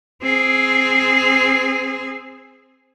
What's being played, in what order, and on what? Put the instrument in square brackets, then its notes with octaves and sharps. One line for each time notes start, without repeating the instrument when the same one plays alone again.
[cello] C4 G#4